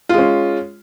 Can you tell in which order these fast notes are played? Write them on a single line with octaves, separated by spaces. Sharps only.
F4 G#3 C#4